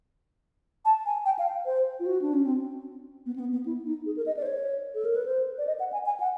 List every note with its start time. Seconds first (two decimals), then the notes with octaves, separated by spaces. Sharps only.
0.85 A5
1.06 G#5
1.25 G5
1.39 F5
1.66 C5
2.00 F4
2.06 F#4
2.22 D4
2.33 C#4
2.46 C4
3.26 B3
3.36 C4
3.40 B3
3.52 B3
3.66 E4
3.86 D#4
4.06 G#4
4.17 A#4
4.26 D#5
4.37 D5
4.42 C5
4.46 C#5
4.95 A4
5.05 A#4
5.16 B4
5.26 C5
5.58 D5
5.67 D#5
5.80 F#5
5.93 G#5
6.06 G#5
6.20 F#5